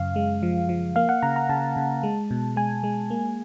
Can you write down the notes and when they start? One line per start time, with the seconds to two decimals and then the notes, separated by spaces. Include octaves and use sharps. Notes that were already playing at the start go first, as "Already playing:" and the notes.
Already playing: F#2 C#3 F5
0.16 G#3
0.43 F3
0.69 F3
0.96 A#3 F5
1.09 F#5
1.23 C#3 A#5
1.36 A#5
1.49 C#3 A5
1.77 C#3
2.03 G#3
2.31 B2
2.56 G#3 G#5
2.83 G#3
3.10 A#3